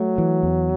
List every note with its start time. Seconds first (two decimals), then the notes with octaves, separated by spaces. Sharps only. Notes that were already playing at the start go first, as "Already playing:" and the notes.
Already playing: F#3 A3
0.18 E3
0.43 E2